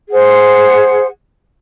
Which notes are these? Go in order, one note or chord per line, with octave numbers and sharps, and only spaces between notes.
G#4 C5 F#5